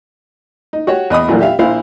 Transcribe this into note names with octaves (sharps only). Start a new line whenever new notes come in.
D#4
F#4 G4 C#5
E2 D#5 B5 D#6
A#1 A#2 E3 F#3 A3 A#3
G4 E5 F5
A#1 E4 C5 F5